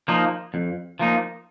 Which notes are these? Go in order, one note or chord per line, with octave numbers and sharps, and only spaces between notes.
F3 A#3 D#4
F2
F3 A#3 D#4